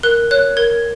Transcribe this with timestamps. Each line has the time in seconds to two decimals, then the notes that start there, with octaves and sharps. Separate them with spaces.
0.03 A#4 F#6
0.31 C#5 F#6
0.57 A#4 G#6